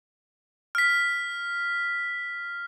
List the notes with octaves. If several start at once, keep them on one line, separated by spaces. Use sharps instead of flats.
F6 B6